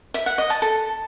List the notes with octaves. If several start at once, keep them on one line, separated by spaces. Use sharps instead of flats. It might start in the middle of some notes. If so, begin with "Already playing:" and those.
E5
F#5
D#5
A5
A4